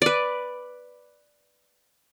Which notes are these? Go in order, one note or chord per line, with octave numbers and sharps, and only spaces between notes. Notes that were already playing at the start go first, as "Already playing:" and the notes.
B4 D5